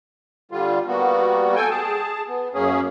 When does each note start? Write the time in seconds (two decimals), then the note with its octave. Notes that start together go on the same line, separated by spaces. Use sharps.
0.51 D3 G3 F4
0.87 G3 A#3 B3 F#4
1.56 A4 G5 G#5
1.70 G#4 A5
2.28 B3
2.54 F#2 A#3 C#4 G#4